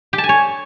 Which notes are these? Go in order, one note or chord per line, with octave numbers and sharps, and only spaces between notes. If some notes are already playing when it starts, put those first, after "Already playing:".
G4
A5
G#5
C#5